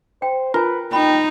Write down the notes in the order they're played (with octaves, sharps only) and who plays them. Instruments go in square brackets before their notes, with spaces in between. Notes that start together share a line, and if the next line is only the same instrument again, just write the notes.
[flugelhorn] C5 [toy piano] G5
[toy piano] F4 G#5 [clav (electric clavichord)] A#4 [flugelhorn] B4
[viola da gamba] D#4 [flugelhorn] G5 [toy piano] B5